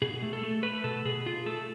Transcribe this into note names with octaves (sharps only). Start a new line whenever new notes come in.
B2 G#4
A3
A4
A3
A3 B4
B2 A4
B2 G#4
F4 G#4
A3 A4